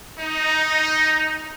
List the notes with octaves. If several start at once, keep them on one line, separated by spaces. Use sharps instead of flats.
D#4